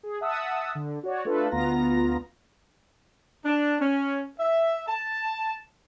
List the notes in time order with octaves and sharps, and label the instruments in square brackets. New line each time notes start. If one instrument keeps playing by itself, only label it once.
[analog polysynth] G#4
E5 F#5 A5 D#6 E6
D3
F#4 C#5 D5
A3 D4 F4 A4 B4
D2 B3 F4 A#5 A#6
[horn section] D4
C#4
E5
A5